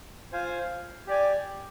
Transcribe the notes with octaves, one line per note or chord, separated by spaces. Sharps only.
F4 C5 F5 G#5
G4 D5 G#5